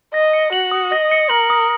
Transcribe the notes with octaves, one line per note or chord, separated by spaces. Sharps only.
D#5 A#6
C#7
F#4 F#7
D#6
D#5 A#6
C#7
A#4 F#7
D#6